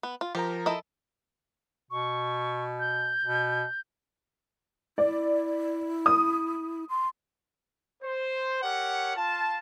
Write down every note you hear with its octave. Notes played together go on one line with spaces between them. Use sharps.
B3
F4
F3 G4 A#4 A#5
E4 A4 D#5
B2 C#6
G6
B2
E4 D5
D#6
C6
C5
G4 A#4 C#5 F#5
F4 A5